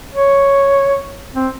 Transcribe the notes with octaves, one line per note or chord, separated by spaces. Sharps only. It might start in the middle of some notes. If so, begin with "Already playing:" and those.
C#5
C4